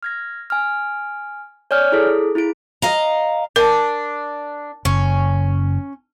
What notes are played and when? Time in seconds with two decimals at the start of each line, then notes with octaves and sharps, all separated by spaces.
0.03 F6 G#6 A#6
0.50 G#5 F6
1.71 C#5 D5 G#5 F6 G6
1.92 E4 G#4 A4
2.35 E4 F4 G#4 D7
2.82 D#5 F5 A#5
3.56 D4 A#4
4.85 F#1 C#4